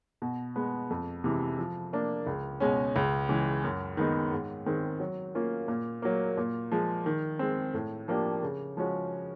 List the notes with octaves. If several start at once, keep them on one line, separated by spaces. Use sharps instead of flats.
B2
G#3 B3
F2
C3 E3 G#3
F3
A#3 D4
C#2
B2 G#3 C#4
C#2
C#3 E3 G#3
F#2
D#3 G#3 B3 D#4
G#2
D#3 G#3 C4
F#3
A#3 C#4 F4
A#2
F#3 A#3
A#2
F3 G#3
D#3
G#3 C4
A2
F3 A#3 D4 G4
C#3
F3 G#3 C#4 F#4